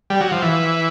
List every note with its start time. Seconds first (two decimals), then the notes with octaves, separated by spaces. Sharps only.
0.10 G3
0.21 F#3
0.32 F3
0.42 E3